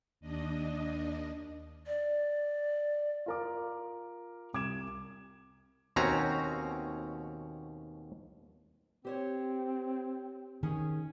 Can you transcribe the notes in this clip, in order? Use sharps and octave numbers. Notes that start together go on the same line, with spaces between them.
D#2 D4 D#5
D5
F4 A#4 D6
C2 D6 G#6 E7
D#2 B2 C4 C#4 F#4 A#5
C4 G4 C5 C#5
D#3 C#4 G#4